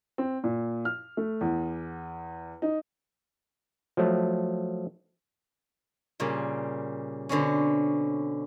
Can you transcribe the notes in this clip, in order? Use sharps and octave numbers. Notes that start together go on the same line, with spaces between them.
C4
A#2
F6
A3
E2
D#4
F3 F#3 A3
A#2 C#3 G3
B2 D3 C4 C#4